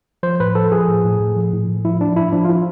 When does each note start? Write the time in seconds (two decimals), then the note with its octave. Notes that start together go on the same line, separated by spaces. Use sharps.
0.23 F3 C5
0.40 A2 B4
0.55 F3 A4
0.72 F3 G#4
0.88 A2
1.05 A2
1.20 A2
1.36 F3
1.53 A2
1.68 A2
1.85 F3 E4
2.01 F3 D4
2.16 G#2 E4
2.32 F3 D4
2.45 F4
2.49 F3 E4